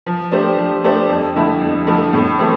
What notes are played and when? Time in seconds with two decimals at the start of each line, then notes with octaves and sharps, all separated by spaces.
0.06 F3
0.31 A3 D4 G4 C5
0.57 F3
0.84 A3 D4 G4 C5
1.09 F2
1.35 D3 F3 A3 E4
1.61 F2
1.87 D3 F3 A3 E4
2.13 A2
2.39 E3 A3 C4